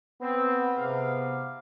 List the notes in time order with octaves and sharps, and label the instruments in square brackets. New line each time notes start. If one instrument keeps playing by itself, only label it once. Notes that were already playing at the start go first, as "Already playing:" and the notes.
[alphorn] B3 [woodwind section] C4
[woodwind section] G#2 C3 F5